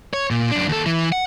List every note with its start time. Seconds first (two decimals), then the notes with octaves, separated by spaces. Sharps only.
0.14 C#5
0.31 A#2
0.51 F#2 D4
0.69 D#2 A4
0.86 E3
1.12 F#5